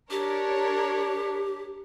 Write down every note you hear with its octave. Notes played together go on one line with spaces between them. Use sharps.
D4 G4 A#4 C#5